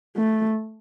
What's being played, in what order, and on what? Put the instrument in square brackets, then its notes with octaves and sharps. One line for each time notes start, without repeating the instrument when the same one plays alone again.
[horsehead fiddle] A3